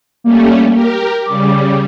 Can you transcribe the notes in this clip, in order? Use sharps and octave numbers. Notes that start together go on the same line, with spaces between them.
G3 A3 A#3 C#4
G4 A#4
C#3 G3 D6